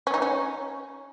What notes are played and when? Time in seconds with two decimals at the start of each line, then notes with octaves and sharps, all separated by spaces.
0.07 C#4
0.14 D#4
0.22 C#4